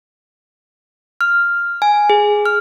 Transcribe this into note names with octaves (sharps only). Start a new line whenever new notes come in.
F6
G#5
G#4
F6